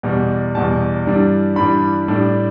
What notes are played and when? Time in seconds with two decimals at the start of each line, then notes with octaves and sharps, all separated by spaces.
0.03 E2 B2 G3
0.55 E2 B2 G3 A5
1.06 G2 E3 G3 D4
1.56 G2 E3 G3 D4 B5
2.08 A2 G3 D4